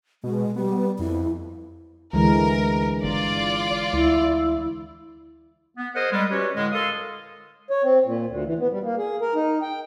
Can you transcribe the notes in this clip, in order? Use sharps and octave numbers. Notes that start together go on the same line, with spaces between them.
B2 G#3
G3 B3
F2 E4
D2 D3 E3 G#3 A#4
G1 F4 D5
D2 E4
B3
G#4 A#4 C5 D#5 F#5
G3 G#3
C#4 F#4 G4 B4 C#5
A2 D3 G#3
A4 A#4 F5 C6 D#6
C#5
C4
A#2
D2
E3
B3
G3
A#3
G#4
A#4
D#4
G5